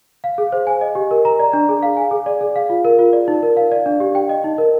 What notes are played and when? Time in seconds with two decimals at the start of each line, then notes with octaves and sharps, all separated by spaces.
0.24 F5
0.38 G#4
0.52 C5
0.67 G#5
0.81 D#5
0.95 G4
1.11 A#4
1.25 A#5
1.40 D5
1.53 D4
1.69 G#4
1.82 F5
1.97 G#5
2.11 G#4
2.26 D5
2.41 G#4
2.56 F5
2.70 F4
2.85 A#4
2.99 F4
3.13 D5
3.28 D#4
3.43 A#4
3.57 F5
3.72 D5
3.86 D4
4.00 G4
4.15 G5
4.29 D#5
4.44 D#4
4.58 A#4